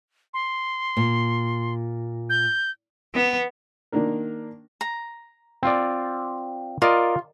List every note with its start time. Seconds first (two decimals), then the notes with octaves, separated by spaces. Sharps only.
0.34 C6
0.97 A#2
2.30 G6
3.14 B3
3.92 D#3 A#3 D4 A#4
4.81 A#5
5.63 C4 F4 D5
6.82 F4 A#4 D5 D#5